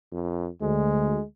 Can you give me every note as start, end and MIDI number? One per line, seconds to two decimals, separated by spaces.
0.12 0.49 41
0.62 1.18 38
0.62 1.24 56